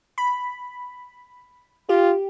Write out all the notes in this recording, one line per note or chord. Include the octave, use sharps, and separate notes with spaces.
B5
F4 G4